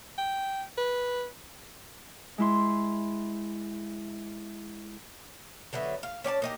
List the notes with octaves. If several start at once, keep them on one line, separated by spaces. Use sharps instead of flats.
G5
B4
G#3 E4 C6
D3 F#3 B3 E5
F5
C#4 D5 G#5 A5
A#3 D#4 G4